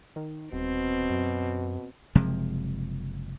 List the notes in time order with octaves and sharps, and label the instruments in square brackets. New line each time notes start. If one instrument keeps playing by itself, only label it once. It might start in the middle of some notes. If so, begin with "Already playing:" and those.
[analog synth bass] D#3
[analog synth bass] D#1 [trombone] B2 [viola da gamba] C4
[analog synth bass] F#2
[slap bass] F#1 C3 F3 G#3